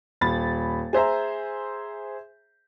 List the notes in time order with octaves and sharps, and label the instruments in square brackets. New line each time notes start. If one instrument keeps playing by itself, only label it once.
[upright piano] D#1 B5 A6
G#4 C5 E5 A#5